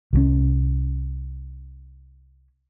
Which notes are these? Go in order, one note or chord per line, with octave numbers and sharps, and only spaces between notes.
C2 F3 C#4